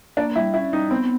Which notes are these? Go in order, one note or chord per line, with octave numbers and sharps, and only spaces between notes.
A#3 D4
G3 E4
C#4 E4
G3 D#4
B3 C4